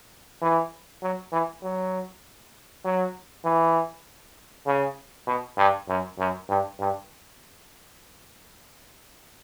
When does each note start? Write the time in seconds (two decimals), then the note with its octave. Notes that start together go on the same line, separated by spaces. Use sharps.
0.42 E3
1.03 F#3
1.32 E3
1.63 F#3
2.85 F#3
3.45 E3
4.67 C#3
5.27 B2
5.58 G2
5.88 F#2
6.18 F#2
6.49 G2
6.79 G2